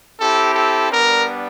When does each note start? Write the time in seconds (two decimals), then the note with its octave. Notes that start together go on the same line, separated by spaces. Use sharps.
0.18 C4 E4 G4 A4
0.55 A4
0.92 G3 B3 D4 A#4